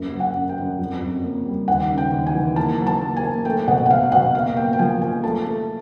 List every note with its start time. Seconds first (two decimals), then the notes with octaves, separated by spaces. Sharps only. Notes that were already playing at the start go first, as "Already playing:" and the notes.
Already playing: F#2 A#3
0.12 F#3
0.20 F#5
0.34 F#2
0.49 G5
0.58 F#2
0.79 F2
1.01 F2
1.24 A#3
1.45 G3
1.68 D#2 F#5
1.90 C#3
1.98 G5
2.12 D#2
2.27 G#5
2.35 E3
2.56 A#3 A5
2.78 F#3
2.87 A5
3.01 A#3
3.17 G#5
3.23 A#3
3.45 A3 G5
3.68 B2 F#5
3.86 F#5
3.90 B2 F5
4.12 B2 F#5
4.35 A#3 F5
4.56 A#3 G5
4.73 G5
4.79 F3 G#5
5.02 A#3 G#5
5.24 A3 A5
5.46 A3